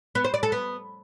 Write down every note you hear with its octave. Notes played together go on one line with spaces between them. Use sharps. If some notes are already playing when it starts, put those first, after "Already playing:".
B3
C5
D5
A4
B3